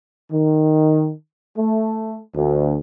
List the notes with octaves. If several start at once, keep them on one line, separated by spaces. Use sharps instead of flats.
D#3
A3
D2